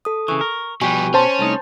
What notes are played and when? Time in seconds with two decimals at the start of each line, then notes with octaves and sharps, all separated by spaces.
0.05 A4 D#6
0.28 C#3 E3 C#6
0.41 A#4
0.81 B2 F3 G3 G4 B4 G#5 C#6
1.14 C#4 C5 A5 C6
1.39 C2 A3 D#4